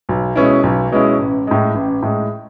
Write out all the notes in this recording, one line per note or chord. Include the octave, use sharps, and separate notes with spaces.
B1
B2 G#3 C#4 E4
B1
B2 G#3 C#4 E4
A1
A2 G#3
A1
A2 G#3